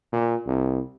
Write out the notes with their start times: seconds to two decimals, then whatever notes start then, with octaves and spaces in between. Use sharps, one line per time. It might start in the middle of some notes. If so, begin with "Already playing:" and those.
0.12 A#2
0.46 C2